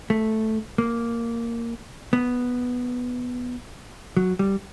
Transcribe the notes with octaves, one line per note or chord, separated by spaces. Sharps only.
A3
A#3
B3
F#3
G3